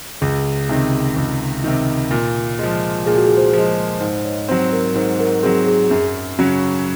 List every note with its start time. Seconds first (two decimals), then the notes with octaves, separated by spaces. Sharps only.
0.21 C#2 G#4
0.69 C3 D#3
1.17 C#2
1.64 C3 D#3
2.11 A#2
2.59 F3 G#3
3.06 A#2 G#4
3.16 F#4
3.27 G#4
3.37 C5
3.53 F3 G#3
3.69 C5
4.00 G#2 C5
4.15 D#5
4.25 C#5
4.48 F#3 C4 C5
4.73 A#4
4.95 G#2 C5
5.20 A#4
5.43 C4 G#4
5.46 F#3
5.67 G#4
5.91 F#2
6.39 C#3 F#3 C#4 F#4